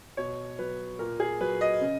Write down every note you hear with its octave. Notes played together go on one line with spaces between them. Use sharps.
B2 C#5
F#3 B4
A#2 A#4
G#4
F#3 B4
D#5
C#3